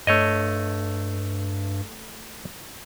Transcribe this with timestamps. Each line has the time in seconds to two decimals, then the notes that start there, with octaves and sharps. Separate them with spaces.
0.07 G2 A3 C#5 D#5